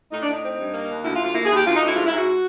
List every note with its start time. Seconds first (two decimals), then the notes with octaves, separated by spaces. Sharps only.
0.12 A2 D#4
0.23 D4
0.27 A2 D#4
0.43 C4
0.58 G2
0.73 A#3
0.89 D#2
1.04 D2 E4
1.15 F4
1.19 D2
1.25 F4
1.34 A#3 E4
1.45 G#4
1.50 D#2
1.55 G4
1.65 D2 F4
1.75 D#4
1.81 D2
1.86 E4
1.96 G#2 F4
2.06 E4
2.11 G#2
2.17 F#4